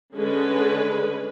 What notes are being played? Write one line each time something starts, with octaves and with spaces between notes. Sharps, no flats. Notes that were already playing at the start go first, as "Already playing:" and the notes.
D3 G#3 C#4 G#4 B4